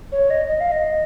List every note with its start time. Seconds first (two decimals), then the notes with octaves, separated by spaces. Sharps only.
0.12 C#5
0.30 D#5
0.48 D#5
0.60 F5
0.72 D#5